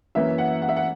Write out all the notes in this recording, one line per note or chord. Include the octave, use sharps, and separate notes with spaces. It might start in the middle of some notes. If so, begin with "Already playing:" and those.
F#2 E3 A#3 C#4 E5
F#5
F#5
E5
F#5